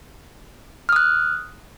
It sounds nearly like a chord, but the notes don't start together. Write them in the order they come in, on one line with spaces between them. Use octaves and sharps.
F6 D#6 F#6